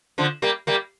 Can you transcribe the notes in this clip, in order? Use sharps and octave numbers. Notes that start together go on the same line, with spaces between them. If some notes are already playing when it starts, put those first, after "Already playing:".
D3 F3
G3 A#3
G3 A#3